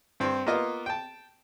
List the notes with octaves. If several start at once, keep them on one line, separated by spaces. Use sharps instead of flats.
G2 C4
A#3 B3 F4 D#5
G5 A5